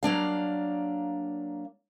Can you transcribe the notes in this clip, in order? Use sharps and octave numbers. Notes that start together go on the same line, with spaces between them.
F#3 A#3 D4 F5